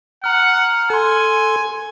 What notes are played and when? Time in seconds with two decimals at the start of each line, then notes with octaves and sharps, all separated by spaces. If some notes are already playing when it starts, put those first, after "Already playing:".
0.24 F#5 A#5 F6
0.90 A4 G#5 C6